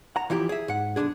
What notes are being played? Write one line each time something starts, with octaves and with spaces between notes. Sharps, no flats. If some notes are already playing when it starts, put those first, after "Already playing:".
F#5 A#5
E3 F3 E4 G4
G#4 E5
G#2 F#5
B1 F#2 D3 D4 G#4